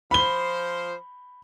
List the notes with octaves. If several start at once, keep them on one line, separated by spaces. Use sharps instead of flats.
F3 C5 B5 G7